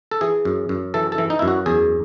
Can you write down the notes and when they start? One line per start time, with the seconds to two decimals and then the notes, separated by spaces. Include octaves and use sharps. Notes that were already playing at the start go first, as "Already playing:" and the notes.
0.11 A4
0.21 E3 G#4
0.45 F#2
0.69 F#2
0.94 E3 A4
1.12 A4
1.18 E3
1.30 D#4
1.39 F#2 E4
1.48 F#4
1.66 E2 G#4